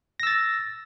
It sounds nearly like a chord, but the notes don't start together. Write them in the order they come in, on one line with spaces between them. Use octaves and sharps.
A#6 E6 A6